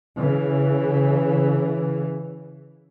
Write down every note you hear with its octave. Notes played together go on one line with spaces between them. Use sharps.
C#3 E3